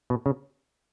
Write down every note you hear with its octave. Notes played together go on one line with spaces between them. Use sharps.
B2
C#3